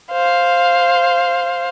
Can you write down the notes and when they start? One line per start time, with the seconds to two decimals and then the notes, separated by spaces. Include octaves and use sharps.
0.11 C5 F5